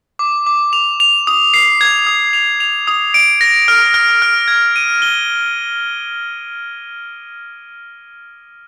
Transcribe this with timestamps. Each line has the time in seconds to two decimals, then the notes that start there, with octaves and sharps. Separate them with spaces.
0.19 D6
0.47 D6
0.73 F7
1.00 F7
1.27 D#6
1.54 C7
1.81 G#6
2.07 D#6
2.33 F7
2.60 F7
2.87 D#6
3.14 D7
3.41 A#6
3.68 F6
3.94 F6
4.22 F6
4.48 G#6
4.76 D#7
5.02 G7